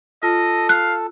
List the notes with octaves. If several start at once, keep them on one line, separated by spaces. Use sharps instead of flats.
F4 A4 D#5
F5 F#6